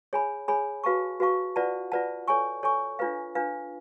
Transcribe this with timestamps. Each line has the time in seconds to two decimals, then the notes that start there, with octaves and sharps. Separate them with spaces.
0.13 G#4 C#5 G#5 B5
0.48 G#4 C#5 G#5 B5
0.84 F#4 B4 F5 A5 C#6
1.20 F#4 B4 F5 A5 C#6
1.56 F4 B4 D5 F#5 A5
1.92 F4 B4 D5 F#5 A5
2.28 A4 C#5 G#5 C#6
2.63 A4 C#5 G#5 C#6
2.99 D4 F4 B4 F5
3.35 D4 F4 B4 F5